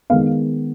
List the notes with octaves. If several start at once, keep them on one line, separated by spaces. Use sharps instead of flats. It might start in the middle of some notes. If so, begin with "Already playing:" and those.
D#3 G#3 B3 F5